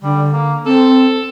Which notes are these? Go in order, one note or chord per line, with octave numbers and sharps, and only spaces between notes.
D3 G3
A#3
C4 A4